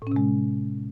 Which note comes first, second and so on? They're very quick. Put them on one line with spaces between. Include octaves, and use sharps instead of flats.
A2 C#4 C3 G#3